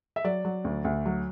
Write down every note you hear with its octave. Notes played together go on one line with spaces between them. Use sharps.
E5
F#3 D5
F#3
D2
D2
F#3